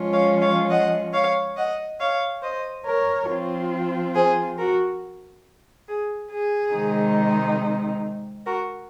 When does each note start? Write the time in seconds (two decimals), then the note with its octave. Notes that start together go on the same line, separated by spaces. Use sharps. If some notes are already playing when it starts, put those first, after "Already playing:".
Already playing: F3 G#3 C#4 F4
0.13 C#5 F5
0.41 C#5 F5
0.69 D#5 F#5
1.13 C#5 F5
1.56 D#5 F#5
1.99 C#5 F5
2.42 C5 D#5
2.85 A#4 C#5
3.28 F3 C4 F4
4.14 G#4 C5
4.58 F#4 A#4
5.87 G#4
6.30 G#4
6.73 C3 D#3 G#3 C4 D#4
8.46 F#4 A#4